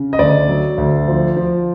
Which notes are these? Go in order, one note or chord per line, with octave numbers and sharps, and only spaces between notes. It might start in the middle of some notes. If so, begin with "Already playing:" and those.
Already playing: C#3
D#5
D2 D5
F#3
D2
F3
F3